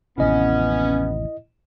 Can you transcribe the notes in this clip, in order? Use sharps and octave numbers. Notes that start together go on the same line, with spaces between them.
A1 D#2 C3 B3 C#4 E4 D#5